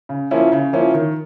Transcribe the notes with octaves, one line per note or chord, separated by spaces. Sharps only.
C#3
F3 A#3 C#4 E4
C#3
F3 A#3 C#4 E4
D#3